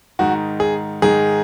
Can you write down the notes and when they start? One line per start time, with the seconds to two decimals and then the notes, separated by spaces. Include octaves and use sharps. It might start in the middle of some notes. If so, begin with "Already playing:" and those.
0.19 G#2 D#3 F#4
0.60 G#4
1.02 G#2 D#3 G#4